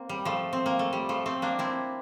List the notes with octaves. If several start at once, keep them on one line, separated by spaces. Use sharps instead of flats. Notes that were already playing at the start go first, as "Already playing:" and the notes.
Already playing: A#3 C4
G3
F3 A3
C4
A#3
A3
G3
F3 A3
A3 C4
A#3 D4
C4 E4